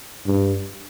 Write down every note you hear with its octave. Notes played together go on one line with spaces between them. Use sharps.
G2